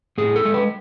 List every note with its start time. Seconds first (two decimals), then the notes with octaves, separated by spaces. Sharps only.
0.18 A2 G#4
0.36 A4
0.45 G#3
0.54 B4